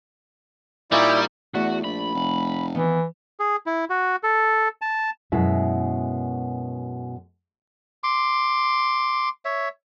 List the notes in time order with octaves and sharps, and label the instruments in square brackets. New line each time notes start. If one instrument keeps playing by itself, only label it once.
[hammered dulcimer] A#2 D#4 C#6 [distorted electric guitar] G3 [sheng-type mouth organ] E4 D5
[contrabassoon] E2 [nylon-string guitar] A3 D5 E5 [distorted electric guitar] F#4
[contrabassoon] A#1 [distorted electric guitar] B5
[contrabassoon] F1
[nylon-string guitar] D#3 B3 [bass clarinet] E3
[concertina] G#4
E4
F#4
A4
A5
[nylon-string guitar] F#2 B2 G#3 E4 E5
[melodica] C6 D6
C#5 E5